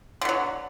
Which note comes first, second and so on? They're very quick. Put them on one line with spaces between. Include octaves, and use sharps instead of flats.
D3 B2 F#3